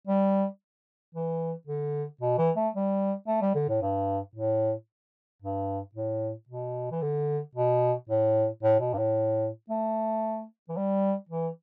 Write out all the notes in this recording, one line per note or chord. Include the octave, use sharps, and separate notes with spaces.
G3
E3
D3
B2
E3
A3
G3
A3
G3
D3
A2
G2
A2
G2
A2
B2
E3
D3
B2
A2
A2
B2
G2
A2
A3
E3
G3
E3